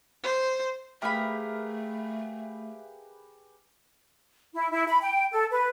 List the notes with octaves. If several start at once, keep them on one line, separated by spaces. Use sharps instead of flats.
C5
A3 G4 G#4 A#4 B4 E5 F5 B5
E4
E4
B5
G5
A4
B4